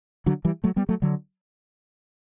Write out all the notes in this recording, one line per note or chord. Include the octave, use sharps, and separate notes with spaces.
D3 F#3
E3 G3
F#3 A3
G3 B3
F#3 A3
D3 F#3